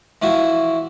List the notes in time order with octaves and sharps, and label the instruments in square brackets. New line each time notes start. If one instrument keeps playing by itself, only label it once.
[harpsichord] E3 F3 E4 F#4